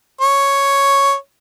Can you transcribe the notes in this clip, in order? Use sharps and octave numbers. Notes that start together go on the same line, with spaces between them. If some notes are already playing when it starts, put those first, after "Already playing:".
C#5